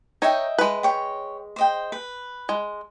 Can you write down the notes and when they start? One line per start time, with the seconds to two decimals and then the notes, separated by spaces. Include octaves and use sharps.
0.22 D#4 C#5 D#5 E5 G5
0.58 G#3 B4
0.83 C#5 G5
1.56 C5 D#5 G5
1.92 B4
2.49 G#3